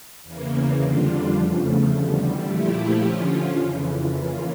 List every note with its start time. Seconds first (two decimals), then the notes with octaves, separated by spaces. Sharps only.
0.24 E2 C#3 E3 A#3
0.79 F2 D3 G3 D4 F4
1.35 E2 C#3 F3 A3
1.90 E2 D3 G3
2.45 A#2 F3 A3 E4 G4
3.00 D3 F3 C#4 F4
3.56 F2 C#3 E3
4.11 E3 A#3 C#4 F4